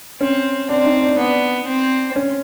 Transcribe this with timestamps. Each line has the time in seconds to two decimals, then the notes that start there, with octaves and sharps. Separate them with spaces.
0.20 C4 C#4
0.69 C4 D4
0.86 D#4
1.02 D4
1.18 B3 D4
1.67 C4
2.16 C#4